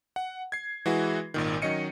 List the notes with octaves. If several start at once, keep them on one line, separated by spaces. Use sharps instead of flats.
F#5
G#6 C7
E3 G#3 E4 F#4 G#4 B4
G#1 A#2 D#3
D#3 F#3 C#4 D#5 C#7 D#7